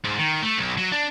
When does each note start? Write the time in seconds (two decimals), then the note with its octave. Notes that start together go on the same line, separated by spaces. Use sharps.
0.04 G#2
0.18 D#3
0.42 A3
0.58 B1
0.78 F#3
0.92 D4